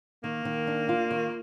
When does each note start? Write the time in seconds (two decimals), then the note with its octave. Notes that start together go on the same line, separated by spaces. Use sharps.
0.23 D#3 A#3
0.45 D#3
0.67 D4
0.89 F4
1.11 D#3